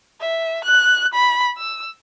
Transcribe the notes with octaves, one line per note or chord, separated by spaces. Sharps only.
E5
F#6
B5
E6